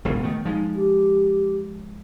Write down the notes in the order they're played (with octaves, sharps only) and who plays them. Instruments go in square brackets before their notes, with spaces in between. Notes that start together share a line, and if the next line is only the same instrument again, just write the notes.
[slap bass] E1 C#2 A#2 [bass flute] B3
[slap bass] D#3 A3
[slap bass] F3 G#3 [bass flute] D#4
[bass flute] G4